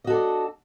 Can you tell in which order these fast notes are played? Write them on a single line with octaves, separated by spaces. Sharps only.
D#5 F#4 A4 D4